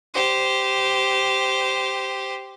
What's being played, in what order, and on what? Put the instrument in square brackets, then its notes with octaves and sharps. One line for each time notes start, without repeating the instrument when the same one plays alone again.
[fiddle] G4 C5